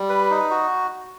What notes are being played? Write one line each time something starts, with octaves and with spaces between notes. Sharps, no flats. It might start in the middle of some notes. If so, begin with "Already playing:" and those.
Already playing: G3
B4
D#4
F#4